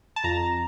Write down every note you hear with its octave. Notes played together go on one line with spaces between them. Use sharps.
A5
F2 A#5